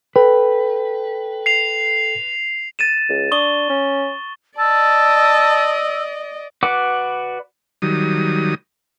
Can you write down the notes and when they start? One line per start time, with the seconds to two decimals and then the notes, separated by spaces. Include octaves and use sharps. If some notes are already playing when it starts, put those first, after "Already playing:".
0.16 A4 B4 G5
1.46 C7 F7
2.79 A6 D#7 E7
3.09 C#2
3.32 D4 C#6 D#6 G7
3.69 C#4
4.58 D5 D#5 A5 E6
6.63 F#4 B4 D5 F#5 D6
7.82 D#3 F#3 G3 D#6